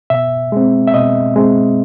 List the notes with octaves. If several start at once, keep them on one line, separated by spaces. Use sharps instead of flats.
B2 E5
G#3 C4
E5
B2 D#5
G#3 C4